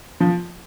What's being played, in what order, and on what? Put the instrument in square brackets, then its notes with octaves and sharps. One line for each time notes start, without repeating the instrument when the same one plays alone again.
[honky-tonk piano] F3